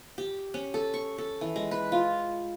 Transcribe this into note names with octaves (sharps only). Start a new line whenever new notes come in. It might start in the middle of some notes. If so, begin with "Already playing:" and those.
G4
C#4
A4
C#6
A4
E3
G#3
B4
F4